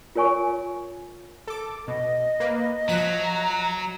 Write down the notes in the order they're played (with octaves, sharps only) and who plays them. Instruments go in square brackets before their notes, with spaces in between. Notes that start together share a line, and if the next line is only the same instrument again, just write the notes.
[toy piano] F4 A#4 C#5 G#5 C#6
[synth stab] A4 D6
[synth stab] B2 [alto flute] D#5
[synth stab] A#3 B4
[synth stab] F3 F#6 B6 [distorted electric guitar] F#3 [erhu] A#5